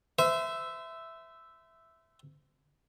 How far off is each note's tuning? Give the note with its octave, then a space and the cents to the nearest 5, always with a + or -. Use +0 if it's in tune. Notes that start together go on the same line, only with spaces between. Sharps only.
C5 -35 E5 +0